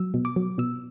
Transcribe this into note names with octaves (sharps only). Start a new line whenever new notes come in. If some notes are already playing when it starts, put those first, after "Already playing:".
Already playing: F#3 E6
B2
D6
F#3
B2 E6